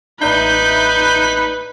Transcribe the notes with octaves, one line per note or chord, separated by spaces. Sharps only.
A1 D#4 B4 D5 E5 G6